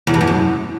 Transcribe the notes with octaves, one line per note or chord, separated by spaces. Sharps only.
E2
G2
E2
F#2